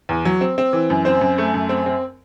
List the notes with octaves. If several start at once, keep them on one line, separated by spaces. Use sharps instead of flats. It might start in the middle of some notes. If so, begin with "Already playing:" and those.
E2
F#3
C4
C4
E3
F#2
C4 C5
F#2
A3
F#2
C4
C4